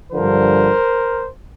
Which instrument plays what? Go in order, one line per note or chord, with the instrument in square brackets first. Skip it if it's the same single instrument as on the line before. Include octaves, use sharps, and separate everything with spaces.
[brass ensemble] G2 D3 F3 A#4 C5